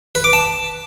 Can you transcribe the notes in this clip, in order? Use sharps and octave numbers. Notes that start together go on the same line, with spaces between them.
B4
D6
A5